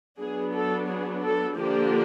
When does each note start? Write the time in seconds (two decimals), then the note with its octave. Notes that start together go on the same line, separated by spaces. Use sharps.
0.20 F#3 B3 D4 G#4
0.54 A4
0.88 G#4
1.24 A4
1.58 D3 F3 A#3 D4 G4